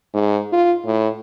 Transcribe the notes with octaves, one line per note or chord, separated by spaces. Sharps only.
G#2
F4
A2